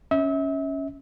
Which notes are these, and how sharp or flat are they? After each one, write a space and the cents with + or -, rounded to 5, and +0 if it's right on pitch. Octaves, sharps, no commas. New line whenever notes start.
C#4 +0 E5 -35